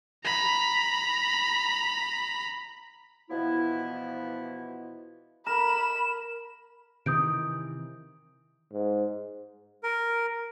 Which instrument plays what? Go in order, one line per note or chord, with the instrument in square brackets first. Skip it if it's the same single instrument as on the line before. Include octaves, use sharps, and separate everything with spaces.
[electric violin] A#5 B5
[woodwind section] B2 E3 F3 B3 E4
[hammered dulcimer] A#4 [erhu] B5 [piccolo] E7
[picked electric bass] C3 D#3 E3 [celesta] D#6 G6 D7
[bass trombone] G#2
[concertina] A#4